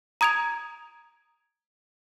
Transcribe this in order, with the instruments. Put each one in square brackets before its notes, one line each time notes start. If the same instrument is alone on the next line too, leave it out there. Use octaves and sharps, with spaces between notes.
[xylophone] A#5 D#6 G#6 D7 F7